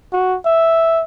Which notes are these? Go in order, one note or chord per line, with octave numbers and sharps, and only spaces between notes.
F#4
E5